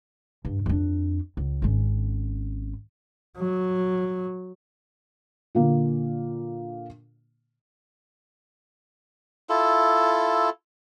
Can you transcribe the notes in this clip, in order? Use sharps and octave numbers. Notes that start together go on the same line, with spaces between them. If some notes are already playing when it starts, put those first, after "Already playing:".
G2
F2 D4
C#2
G#1 C#4
F#3
A#2 D3 A#3
E4 F4 A4